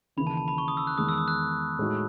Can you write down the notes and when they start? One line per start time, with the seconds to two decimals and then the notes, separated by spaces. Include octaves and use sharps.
0.17 D#2 C#3 E3 B5
0.27 A5
0.37 A5
0.48 B5
0.58 C#6
0.68 D#6
0.77 E6
0.87 F#6
0.98 E2 D#3 G#3 B3 D#6
1.09 E6
1.18 D#6
1.28 F#6
1.79 A2 G#3 D#4 F#4